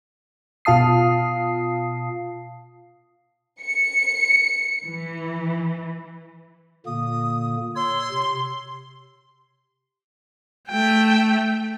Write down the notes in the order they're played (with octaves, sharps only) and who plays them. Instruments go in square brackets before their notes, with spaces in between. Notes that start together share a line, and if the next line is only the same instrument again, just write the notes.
[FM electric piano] B2 F4 F5 A5 D#6 C7
[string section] C#7
E3
[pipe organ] A#2 D3 A#3 [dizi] D#6
[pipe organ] C#5 E6 [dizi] C6
[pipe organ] C3
[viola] A3 G5